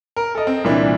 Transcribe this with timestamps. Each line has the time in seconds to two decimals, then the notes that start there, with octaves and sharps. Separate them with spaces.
0.16 A#4
0.35 A4 D#5
0.47 C4
0.64 C2 A#2 E3 C4 D4